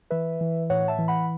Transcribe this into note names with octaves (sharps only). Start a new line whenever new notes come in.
E3 B4 E5
E3
A2 C#5 F#5
E5 A5
E3
F#5 B5